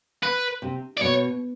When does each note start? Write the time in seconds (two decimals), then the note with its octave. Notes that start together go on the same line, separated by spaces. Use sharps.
0.23 B4
0.62 C3
0.97 D5
1.01 B2 C#5